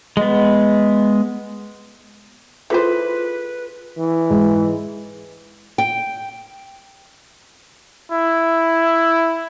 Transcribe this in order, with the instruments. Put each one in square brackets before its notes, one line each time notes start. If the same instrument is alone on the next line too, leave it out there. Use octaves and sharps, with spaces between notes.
[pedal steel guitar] G#3 B3
[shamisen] E3 C5 [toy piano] F4 G#4 A4 [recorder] B4
[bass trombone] E3
[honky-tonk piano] G#2
[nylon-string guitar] G5
[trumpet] E4